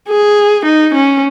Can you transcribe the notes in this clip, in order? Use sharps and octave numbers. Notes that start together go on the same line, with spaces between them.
G#4
D#4
C#4